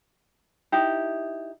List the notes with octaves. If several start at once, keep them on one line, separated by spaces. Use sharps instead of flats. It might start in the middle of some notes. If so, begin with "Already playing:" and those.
D#4 E4 G4